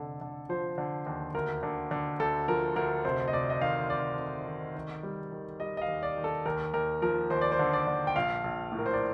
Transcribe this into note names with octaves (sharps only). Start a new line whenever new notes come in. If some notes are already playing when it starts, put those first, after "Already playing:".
Already playing: F1 D3 A4
D3
F3 C5
D3
D#2
D2 A#4
D3
D3
D2 A4
F3 A#4
D2 A#4
F1 C5
D#5
F1 D5
D#5
D#3 F5
F1 D5
F1
D#3
D#3
G3
D#3
G3 D#5
D#5
F5
D#2
D5
D#3
A4
D#2 A#4
D#2 A#4
F3 A#4
D#2 C5
D5
C5
D3
D5
D3
G5
A#1 F5
A#1
A2
A#4
C5
D5